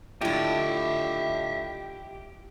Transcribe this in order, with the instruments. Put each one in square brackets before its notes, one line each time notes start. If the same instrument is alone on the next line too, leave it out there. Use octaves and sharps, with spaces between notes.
[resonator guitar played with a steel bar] A2 D3 [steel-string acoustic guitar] E4 F4 [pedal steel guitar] G4 [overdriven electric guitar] D#5 E5